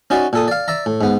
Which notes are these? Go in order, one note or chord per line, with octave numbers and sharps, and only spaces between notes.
C#4 D#4 F#4 D5
A#2 A4 D#6
D5 F5
D5 E5 A#5
A2
G#2 B3